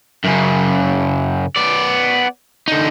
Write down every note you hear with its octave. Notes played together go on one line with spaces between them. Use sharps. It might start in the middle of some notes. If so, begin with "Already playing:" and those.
F#2 C#3
B3 D5
D3 D#4